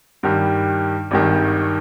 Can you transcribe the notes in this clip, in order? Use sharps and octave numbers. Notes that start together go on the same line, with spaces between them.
G2 D#3 G3
G#1 G2 D#3